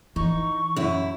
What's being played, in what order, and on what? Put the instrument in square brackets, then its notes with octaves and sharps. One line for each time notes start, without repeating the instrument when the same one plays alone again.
[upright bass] E3 [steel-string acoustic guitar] D#4 [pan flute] C#6
[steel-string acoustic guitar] F#2 E4